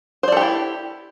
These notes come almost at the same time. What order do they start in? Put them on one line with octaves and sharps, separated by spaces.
C5 D5 A4 G4 E4